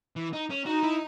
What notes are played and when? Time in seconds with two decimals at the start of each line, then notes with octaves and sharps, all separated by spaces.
0.16 E3
0.33 D#4
0.50 C#4
0.66 D#4 F#4
0.83 E4